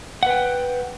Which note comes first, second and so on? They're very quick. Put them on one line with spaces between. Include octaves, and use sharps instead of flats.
F#5 B4 G5